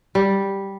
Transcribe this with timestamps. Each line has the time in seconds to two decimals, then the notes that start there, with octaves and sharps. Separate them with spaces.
0.15 G3